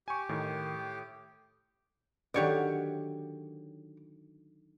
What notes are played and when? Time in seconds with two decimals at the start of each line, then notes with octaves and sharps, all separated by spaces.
0.08 G4 G#5 C#6
0.29 A2 D#3
2.34 D3 D#3 F#3 G4 C#5 D5